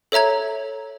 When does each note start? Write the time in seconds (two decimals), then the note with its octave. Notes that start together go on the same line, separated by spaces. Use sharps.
0.12 A4 C#5 E5 A#5 G#6